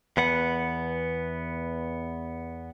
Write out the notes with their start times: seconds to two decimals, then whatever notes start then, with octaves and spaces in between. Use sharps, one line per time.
0.17 E2 B3 F#5